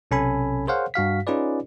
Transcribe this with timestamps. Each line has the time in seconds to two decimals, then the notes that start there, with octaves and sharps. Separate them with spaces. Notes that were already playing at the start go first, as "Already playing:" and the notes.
0.11 B1 C3 C#4 A4 G#5 B5
0.67 G#4 A#4 C5 C#5 F5 F#5
0.94 G2 F#4 F5 B6
1.27 C#4 D#4 F4 G#4 B4 D5